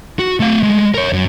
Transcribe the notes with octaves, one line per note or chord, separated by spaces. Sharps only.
F#4
A3 F5
G#3 A3
A#4 C#5
F#2